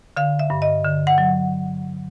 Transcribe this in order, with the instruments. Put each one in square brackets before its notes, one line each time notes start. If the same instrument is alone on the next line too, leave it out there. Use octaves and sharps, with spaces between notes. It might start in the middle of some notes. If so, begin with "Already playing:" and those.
[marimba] D3 F5
E5
G2
D#5
D3
F#5
F#3